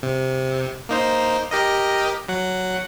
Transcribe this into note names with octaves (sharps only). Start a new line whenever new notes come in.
C3
A#3 D#4 C5
G4 A#4 D#5
F#3 F#5